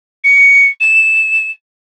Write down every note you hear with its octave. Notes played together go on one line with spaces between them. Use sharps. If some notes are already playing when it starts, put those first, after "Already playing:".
C#7
E7